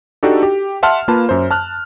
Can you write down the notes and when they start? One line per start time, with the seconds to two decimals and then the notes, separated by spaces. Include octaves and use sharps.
0.23 D4 D#4 F#4 G4 A4
0.43 G4
0.83 E5 F#5 A5 C6 F6
1.08 A#3 F4 B4 A5
1.29 F#2 C5
1.51 A5 F6 F#6